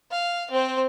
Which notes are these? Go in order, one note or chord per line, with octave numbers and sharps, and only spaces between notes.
F5
C4 C5